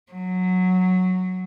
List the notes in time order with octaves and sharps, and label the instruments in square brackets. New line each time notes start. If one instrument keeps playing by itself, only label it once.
[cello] F#3